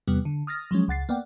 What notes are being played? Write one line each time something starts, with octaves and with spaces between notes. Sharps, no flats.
E2 C3 G3 B3
D3
D#6 F6 A6 A#6
F3 F#3 G#3 C#4
C#2 F#5 A6 C7
A#3 B3 D5 F#5 G5